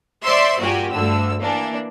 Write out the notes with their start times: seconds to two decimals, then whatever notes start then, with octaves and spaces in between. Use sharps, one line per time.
0.24 C5 D5 E5 C6 C#6
0.59 G2 A#2 F#4 G4 G#5
0.91 D2 G2 D3 E6
1.40 E3 A#3 D4